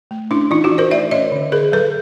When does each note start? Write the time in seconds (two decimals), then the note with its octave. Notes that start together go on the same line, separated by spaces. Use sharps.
0.11 A3
0.31 C#4 D4 E4
0.51 E3 D#4 F4
0.64 E4 F#4
0.72 E3
0.78 A#4 C5
0.91 A3 D5 E5
1.11 C#4 C#5 D#5
1.32 D3
1.52 D3 G#4 A#4
1.72 F#3 A4 B4